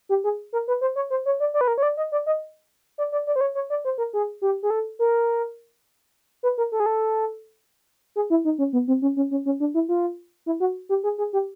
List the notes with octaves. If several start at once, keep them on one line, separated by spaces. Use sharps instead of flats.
G4
G#4
A#4
B4
C5
C#5
C5
C#5
D5
D5
B4
A#4
C#5
D5
D#5
D5
D#5
D5
D5
D5
C5
C#5
C#5
D5
C5
A#4
G#4
G4
G#4
A4
A#4
B4
A#4
A4
G#4
A4
G#4
E4
D#4
C#4
B3
C4
C#4
C#4
C#4
C#4
D4
E4
F4
E4
F#4
G4
G#4
G#4
G4